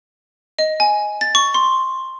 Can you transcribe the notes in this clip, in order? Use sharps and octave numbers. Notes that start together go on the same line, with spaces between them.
D#5
G#5
A6
C#6
C6